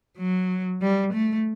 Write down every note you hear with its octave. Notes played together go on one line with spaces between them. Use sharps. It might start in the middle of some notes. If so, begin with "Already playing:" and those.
F#3
G3
A3